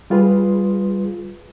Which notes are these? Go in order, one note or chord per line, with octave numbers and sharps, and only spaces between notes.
G3 F4 G#4 B4